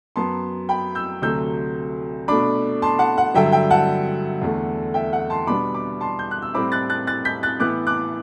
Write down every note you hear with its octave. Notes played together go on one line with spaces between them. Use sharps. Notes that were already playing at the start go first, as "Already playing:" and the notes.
F#2 F#3 B3 A5 C6
G5 B5
E6 G6
D2 C3 F#3 A3 E6 G6
B2 A3 D4 B5 D6
A5 C6
F#5 A5
F#5
G2 D3 F#3 E5 G5
E5 G5
F#5 A5
E2 D3 A3
E5 G5
F#5
A5 C6
B2 G3 B3 D4 B5 D6
B5 D6
A5 C6
G6
F#6
E6
A2 G3 C4 E4 B5 D6
F#6 A6
F#6 A6
F#6 A6
G6 B6
F#6 A6
A2 E3 B3 E4 D6 F#6
D6 F#6